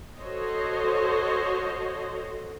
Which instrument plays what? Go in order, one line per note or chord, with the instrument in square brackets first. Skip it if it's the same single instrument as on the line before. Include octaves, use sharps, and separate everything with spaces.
[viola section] F#4 A4 C5 C#5 D#5